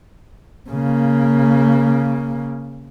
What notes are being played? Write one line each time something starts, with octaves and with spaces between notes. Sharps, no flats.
C#3 A#3